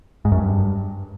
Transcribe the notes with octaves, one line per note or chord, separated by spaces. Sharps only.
G#2
F#2
G2